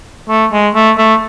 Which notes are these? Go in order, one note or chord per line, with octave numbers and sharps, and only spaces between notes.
A3
G#3
A3
A3